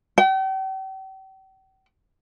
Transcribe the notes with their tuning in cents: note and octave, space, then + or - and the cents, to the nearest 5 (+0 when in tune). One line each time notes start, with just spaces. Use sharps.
G5 -40